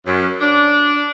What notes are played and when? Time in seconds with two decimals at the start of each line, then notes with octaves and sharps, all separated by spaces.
0.06 F#2
0.40 D4